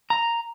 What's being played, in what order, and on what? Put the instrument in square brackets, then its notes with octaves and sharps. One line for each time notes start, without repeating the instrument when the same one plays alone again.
[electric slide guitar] A#5